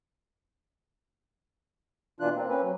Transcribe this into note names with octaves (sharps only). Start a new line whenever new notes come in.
B2 E3 D4 F4 F#6
A#3 C4
A#3 C4 C#4 B4
F#3